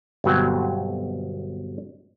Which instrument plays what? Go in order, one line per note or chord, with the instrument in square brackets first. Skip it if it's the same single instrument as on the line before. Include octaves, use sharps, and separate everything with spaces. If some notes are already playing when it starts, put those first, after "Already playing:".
[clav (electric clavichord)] G1 B2 F#3 C4